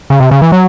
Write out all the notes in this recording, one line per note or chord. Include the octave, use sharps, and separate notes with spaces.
C#3
C3
C#3
E3
F#3